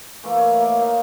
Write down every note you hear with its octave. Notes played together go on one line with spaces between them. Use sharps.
E3 A3 A#3
C#5
A#3
D#4 F5